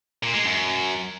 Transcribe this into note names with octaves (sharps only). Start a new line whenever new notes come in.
A#2
G#3
F#2